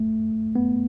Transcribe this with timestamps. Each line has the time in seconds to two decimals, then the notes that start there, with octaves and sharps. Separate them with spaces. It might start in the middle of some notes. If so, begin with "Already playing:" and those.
Already playing: A3
0.56 B3